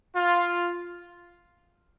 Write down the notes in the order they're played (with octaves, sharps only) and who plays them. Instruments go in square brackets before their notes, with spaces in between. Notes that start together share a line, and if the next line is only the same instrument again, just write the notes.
[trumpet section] F4